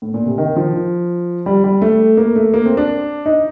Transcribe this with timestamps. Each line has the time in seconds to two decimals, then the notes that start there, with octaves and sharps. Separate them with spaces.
0.02 A2
0.14 A#2
0.26 C3
0.38 D#3
0.56 F3
1.46 G3
1.64 G3
1.82 A3
2.17 A#3
2.36 A3
2.54 A#3
2.66 C4
2.77 D4
3.26 D#4